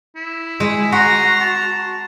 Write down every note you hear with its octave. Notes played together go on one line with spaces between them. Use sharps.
E4
G#3
F#4 A#5 C6
A5